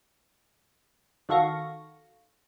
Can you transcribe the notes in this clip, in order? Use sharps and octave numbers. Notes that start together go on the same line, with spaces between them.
D#3 F#4 A4 F5 C#6 A#6